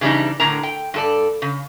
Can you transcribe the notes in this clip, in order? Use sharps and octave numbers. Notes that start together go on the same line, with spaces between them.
C#3 E3 G3 D4 D#4
A2 D3 A#4 A#5
G5
G2 A4 D5
C#3